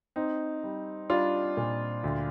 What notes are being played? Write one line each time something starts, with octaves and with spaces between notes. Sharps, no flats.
C4 D#4
G3
G3 D4 F4
A#2
D2